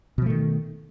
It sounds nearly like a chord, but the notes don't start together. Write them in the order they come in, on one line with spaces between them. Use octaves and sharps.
B2 F3 A3 D#3